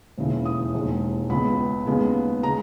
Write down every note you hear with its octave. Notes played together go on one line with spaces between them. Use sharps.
E1 D#2 C#3 E3
D#6
E1 D#2 D#3 G#3
C#2 C#3 G#3 B3 B5
D#2 C#3 G#3 B3
C#3 G#3 A#5